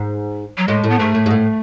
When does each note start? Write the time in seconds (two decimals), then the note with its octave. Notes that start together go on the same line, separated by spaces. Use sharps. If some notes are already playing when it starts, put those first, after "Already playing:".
Already playing: G#2
0.58 F#3
0.68 A2 G#3
0.84 A2
0.90 B3
0.99 G#2 A3
1.15 A2
1.26 G#2
1.31 A2